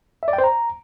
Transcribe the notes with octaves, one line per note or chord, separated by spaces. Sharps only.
E5
D5
G5
C5
A#5